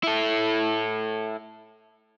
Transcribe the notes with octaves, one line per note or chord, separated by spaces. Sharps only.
E4 A4